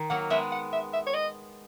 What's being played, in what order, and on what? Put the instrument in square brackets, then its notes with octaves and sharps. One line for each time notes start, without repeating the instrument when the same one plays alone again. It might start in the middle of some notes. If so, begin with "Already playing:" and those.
Already playing: [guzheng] D#3
[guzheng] F#3 A#3 [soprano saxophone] F#5
[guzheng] G#3 B3 [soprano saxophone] E5
[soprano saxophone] F#5
E5
E5
C#5
D#5